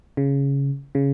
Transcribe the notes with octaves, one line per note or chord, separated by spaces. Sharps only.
C#3
C#3